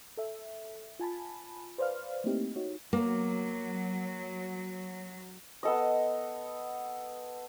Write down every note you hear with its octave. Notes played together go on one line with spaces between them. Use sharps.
A4 E5
F4 G#5 A5 B5
B4 C5 D5 F5 F6
A3 A#3 C4 D#4 E4 G4
D#4 F#4 C#5
F#3 A#3
B3 A4 D#5